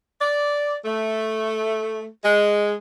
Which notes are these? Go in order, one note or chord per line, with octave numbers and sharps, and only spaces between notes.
D5
A3
G#3